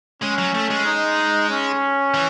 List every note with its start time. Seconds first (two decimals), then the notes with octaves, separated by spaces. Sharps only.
0.22 G#3 C#4
0.38 F#3
0.55 A3
0.70 G#3
0.86 D#4
1.49 C#4
2.14 E3